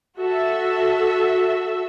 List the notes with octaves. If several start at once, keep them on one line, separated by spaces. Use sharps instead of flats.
F#4 A4 E5